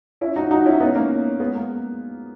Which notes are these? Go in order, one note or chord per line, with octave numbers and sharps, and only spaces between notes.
C#4 E4
D#4 F#4
D#4 F#4
C#4 E4
B3 D#4
A#3 C#4
G#3 B3
A#3